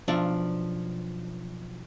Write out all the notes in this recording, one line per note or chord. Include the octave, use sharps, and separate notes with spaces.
B1 F3 D4 D5 E5 F5